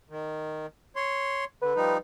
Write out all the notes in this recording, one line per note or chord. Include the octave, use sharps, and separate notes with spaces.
D#3
C#5 C6
D3 B4
F3 G3 D#4